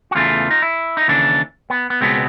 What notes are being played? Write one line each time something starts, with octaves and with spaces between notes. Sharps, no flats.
F#4
E2 C#3 E3 A3 F4
D#4
E4
D#4
D#2 C#3 E3 D4
B3
B3
C#2 B2 G#3 B3 C4